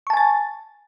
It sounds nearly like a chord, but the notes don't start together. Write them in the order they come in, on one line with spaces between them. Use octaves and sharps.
C#6 A5 G#5 A6